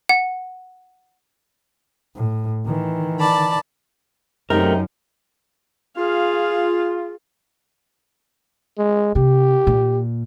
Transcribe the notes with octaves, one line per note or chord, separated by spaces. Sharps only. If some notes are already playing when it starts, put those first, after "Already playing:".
F#5
A2
D#3 E3
D5 A5 B5
F#2 C3 A3 D#4 A#4 G5
F4 G#4 F5
G#3
C3 G4
A#2